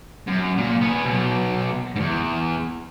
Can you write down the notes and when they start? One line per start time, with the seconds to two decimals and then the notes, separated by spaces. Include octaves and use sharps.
0.28 F#2
0.58 A#2
0.81 B3 G#5
1.05 B2 F#3
1.96 E2 G#2